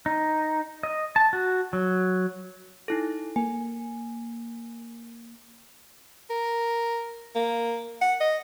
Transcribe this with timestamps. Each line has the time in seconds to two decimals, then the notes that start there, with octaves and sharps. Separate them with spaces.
0.06 D#4
0.83 D#5
1.16 A5
1.33 F#4
1.73 F#3
2.88 D#4 E4 A4
3.36 A#3 G#5
6.30 A#4
7.35 A#3
8.01 F#5
8.20 D#5